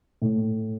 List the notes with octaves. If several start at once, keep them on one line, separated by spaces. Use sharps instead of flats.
A2